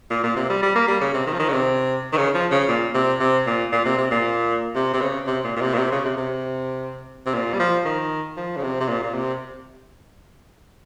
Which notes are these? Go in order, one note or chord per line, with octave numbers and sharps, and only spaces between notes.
A#2
A#2
C3
G3
G3
A#3
G3
C#3
C3
D#3
F3
D#3
C#3
C3
D#3
C#3
F3
C#3
A#2
C3
C3
A#2
A#2
C3
C3
A#2
C3
C3
C#3
C3
A#2
A#2
C3
A#2
C3
C#3
C3
C3
C3
A#2
G3
F3
D#3
F3
C#3
C3
C3
A#2
A#2
C3